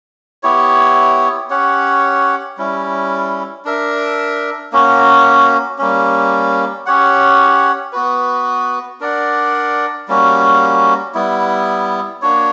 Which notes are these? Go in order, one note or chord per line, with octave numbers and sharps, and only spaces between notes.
B3 E4 G4 C#5
C#4 G4 C#5 F#5
G3 C#4 E4
D4 A#4 E5
A#3 C#4 F#4
G3 A#3 C#4
C#4 G4 C#5 F#5
B3 F#4 B4
D4 A#4 D5 F#5
G3 A#3 C#4 F#4
G3 B3 E4
A#3 D4 F#4 C#5